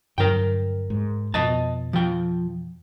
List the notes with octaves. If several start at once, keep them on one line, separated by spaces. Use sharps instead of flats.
G2 D3 F#3 A#4 G5
G#2
F2 B2 D#5 A5
F3 G5